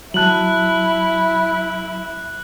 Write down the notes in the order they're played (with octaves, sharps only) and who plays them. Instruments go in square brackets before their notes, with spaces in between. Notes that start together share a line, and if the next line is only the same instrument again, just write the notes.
[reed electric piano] F#3 A5 [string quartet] E4 [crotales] F#6 F#7